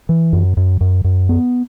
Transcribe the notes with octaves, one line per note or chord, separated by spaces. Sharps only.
E3
F#2
F#2
F#2
F#2
B3